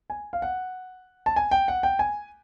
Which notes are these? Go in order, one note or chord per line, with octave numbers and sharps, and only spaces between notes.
G#5
F5
F#5
A5
G#5
G5
F#5
G5
G#5